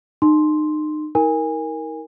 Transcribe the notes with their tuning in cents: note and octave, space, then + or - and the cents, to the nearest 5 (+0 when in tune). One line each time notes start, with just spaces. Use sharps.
D#4 -35 C6 +0
D#4 +40 A#4 +0 G#5 -25